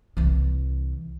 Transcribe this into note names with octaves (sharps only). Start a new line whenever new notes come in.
C2 E3